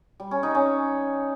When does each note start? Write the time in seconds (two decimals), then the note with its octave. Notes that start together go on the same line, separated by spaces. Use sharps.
0.20 G3
0.31 C#4
0.43 D#4
0.55 C#4